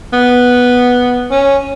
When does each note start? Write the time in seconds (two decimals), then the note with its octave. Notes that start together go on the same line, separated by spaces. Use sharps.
0.13 B3
1.31 C#4